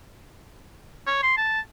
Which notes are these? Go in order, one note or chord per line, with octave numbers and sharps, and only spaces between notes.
C#5
C6
A5